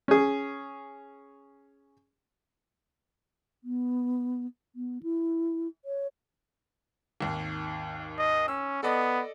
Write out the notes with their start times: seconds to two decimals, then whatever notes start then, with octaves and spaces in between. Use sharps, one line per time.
0.08 C#4 G#4
3.64 B3
4.75 B3
5.03 E4
5.85 C#5
7.21 G#1 D#2
8.19 D#5
8.48 C#4 E6
8.83 B3 A4 D5 D#5